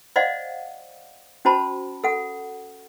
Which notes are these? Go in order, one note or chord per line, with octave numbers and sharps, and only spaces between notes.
C5 D5 D#5 F5 F#5
C#4 F#4 C5 A5 B5
A4 F#5